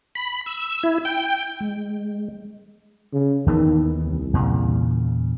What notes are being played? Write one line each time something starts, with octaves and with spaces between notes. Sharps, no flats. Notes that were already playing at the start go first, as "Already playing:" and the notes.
B5
E6
E4
G5
G#3
C#3
D#2 D#3 E3 B3
C2
E2 A#2 C#3